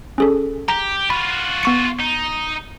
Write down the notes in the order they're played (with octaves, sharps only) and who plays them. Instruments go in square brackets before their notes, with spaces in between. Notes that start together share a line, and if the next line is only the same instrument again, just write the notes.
[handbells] C#4 G#4 A4
[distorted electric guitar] G4 [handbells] A#5
[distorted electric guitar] F4 F#4 [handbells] B5
[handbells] B3 C#6 C#7
[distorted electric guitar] D#4